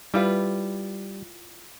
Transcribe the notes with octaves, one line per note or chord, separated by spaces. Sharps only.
G3 E4 F4 B4